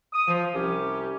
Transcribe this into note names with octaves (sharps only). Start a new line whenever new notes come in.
D#6
F3
C2 C#4 G4